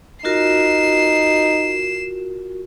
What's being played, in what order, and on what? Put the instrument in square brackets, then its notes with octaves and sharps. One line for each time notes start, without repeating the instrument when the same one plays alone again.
[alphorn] D#4 [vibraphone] F4 F#4 A#4 [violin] C7 E7